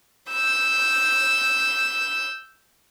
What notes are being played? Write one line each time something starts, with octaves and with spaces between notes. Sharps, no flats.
E6 G6